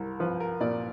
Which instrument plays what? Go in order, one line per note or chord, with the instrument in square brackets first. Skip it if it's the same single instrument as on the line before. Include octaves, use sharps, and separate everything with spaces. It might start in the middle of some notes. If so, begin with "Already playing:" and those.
Already playing: [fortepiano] C2 [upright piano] A#4
[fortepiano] F3 [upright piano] B4
[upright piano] A#4
[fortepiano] A#2 [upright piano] D5